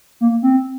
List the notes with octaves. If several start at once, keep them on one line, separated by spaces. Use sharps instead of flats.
A#3
C4